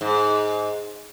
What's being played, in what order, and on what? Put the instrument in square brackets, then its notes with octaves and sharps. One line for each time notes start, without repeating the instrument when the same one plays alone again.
[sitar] G#2